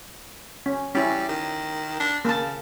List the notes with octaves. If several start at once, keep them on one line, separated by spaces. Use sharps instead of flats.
C#4
G3 C#4 E4
D#3
D4
C#3 A#3 A5